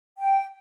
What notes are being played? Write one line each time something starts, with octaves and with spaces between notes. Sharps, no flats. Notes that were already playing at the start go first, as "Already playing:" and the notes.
G5